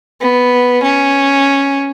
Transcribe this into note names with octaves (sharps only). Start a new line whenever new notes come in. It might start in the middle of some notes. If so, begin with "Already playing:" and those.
B3
C#4